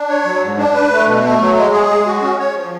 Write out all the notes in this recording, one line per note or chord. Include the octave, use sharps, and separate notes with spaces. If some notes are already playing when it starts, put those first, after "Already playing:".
Already playing: D4
C#5
F#3
G#2
D4
B4
A3
B2
A3
F#3
G#3
G#4
G#3
F#4
C#4
C#5
F3